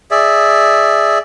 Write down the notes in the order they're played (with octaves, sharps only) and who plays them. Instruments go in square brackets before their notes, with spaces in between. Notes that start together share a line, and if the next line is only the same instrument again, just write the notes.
[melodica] G#4 D5 E5